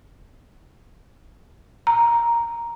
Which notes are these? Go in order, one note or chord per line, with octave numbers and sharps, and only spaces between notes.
A#5